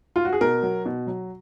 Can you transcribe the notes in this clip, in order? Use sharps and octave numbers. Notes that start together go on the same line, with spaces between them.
F4
F#4
G#4
B2 A#4
F#3
B2
F#3